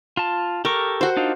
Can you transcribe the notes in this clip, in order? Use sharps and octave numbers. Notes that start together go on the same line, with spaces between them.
F4 A5
G4 A4 A#4 C#6
F#4 C5
D4 D#4 F4